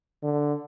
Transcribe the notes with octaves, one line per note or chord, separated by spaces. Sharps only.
D3